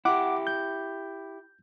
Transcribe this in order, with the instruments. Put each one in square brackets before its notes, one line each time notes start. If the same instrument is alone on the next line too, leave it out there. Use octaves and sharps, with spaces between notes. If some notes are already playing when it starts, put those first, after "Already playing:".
[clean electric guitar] E4 G4 [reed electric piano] F#5 D6
[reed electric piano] G6